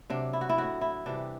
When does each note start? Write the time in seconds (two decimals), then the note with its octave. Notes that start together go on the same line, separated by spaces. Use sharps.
0.10 C3 F#3 D4
0.33 E4
0.41 F#4
0.49 E4
0.57 A2 F#3 F#4
0.81 E4
1.06 C3 E3 G3 D4